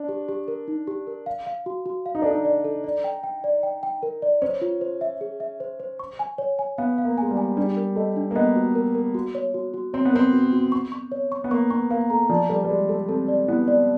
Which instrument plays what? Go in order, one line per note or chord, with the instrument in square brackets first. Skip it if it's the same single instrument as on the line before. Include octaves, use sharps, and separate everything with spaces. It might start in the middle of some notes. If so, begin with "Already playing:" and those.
Already playing: [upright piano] D4
[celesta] G4
G4
A#4
D#4
G4
A#4
F5
F5
F#4
F#4
F5
[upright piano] D#4
[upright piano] D4 [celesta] A4
[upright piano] D#4
[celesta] D5
A4
D5
G5
G5
D5
G5
G5
A#4
D5
[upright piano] C#4 [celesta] C5
[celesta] F4
C5
E5
G#4
E5
C5
C5
C#6
G#5
C#5
G#5
[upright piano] B3 [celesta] F5
[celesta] F5
[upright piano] A#3
[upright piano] G#3 [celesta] G#5
[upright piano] G3
[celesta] G#5
[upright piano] G3 [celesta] D4
[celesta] A#4
[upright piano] A3 [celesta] D#5
[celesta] D4
[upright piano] A#3
[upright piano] B3 [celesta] D#5
[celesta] F#4
A#4
A#4
F#4
C#5
F#4
F#4
[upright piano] C4 [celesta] C#5
[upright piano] B3
[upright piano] C4 [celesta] A#4
[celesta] F#4
F#4
C#6
C#6
C#5
C#6
[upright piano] B3
[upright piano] A#3 [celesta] C#6
[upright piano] B3 [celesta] C#6
[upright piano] A#3 [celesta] F5
[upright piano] A3 [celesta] A#5
[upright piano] F3 [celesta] D5
[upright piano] G3 [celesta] A4
[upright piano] G3
[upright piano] G#3 [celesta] D5
[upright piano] A3 [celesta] A4
[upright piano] C4 [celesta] A4
[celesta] D5
[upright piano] B3 [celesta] E4
[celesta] D5